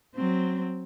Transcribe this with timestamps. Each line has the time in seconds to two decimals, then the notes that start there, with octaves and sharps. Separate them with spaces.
0.16 F#3 C4